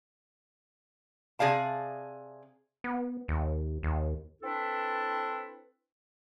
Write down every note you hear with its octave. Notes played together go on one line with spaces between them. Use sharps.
C3 G#4 D5 F5 A5
B3
D#2
D#2
C4 D4 E4 A4 B4